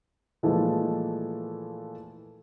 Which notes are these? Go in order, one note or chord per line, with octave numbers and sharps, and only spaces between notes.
A#2 E3 F3 G#3 A3